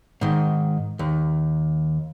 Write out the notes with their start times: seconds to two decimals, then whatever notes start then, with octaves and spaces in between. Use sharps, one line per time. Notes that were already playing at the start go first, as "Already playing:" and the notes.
0.21 G#2 D#3
0.99 D#2